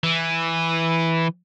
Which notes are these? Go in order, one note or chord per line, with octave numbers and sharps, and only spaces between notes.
E3